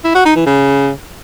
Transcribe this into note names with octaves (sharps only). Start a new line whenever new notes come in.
E4
F#4
D#4
E3
C#3